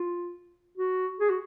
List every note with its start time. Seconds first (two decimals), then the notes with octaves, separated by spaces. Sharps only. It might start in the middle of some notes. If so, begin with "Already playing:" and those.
Already playing: F4
0.77 F#4
1.20 G#4
1.29 F#4